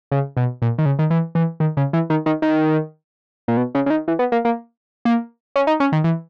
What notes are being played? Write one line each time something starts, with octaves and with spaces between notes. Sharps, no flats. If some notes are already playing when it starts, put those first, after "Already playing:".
C#3
B2
A#2
D#3
C#3
D#3
E3
E3
D#3
C#3
E3
D#3
D#3
D#3
A#2
B2
C#3
C#3
D#3
E3
B3
A#3
A#3
A#3
C#4
D#4
C#4
D#3
E3